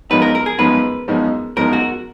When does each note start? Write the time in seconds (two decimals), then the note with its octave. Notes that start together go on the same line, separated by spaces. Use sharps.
0.10 F#2 F3 G#3 B3 D#4 B4
0.22 A#4
0.35 A#4
0.46 G#4
0.58 F#2 F3 G#3 B3 D#4 B4
1.08 F#2 F3 G#3 B3 D#4
1.56 F#2 F3 G#3 B3 D#4 A#4
1.73 F#4